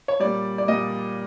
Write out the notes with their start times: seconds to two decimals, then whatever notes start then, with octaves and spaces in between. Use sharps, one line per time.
0.08 C#5
0.20 A#2 G3 D5
0.58 D5
0.68 A#2 G3 D#5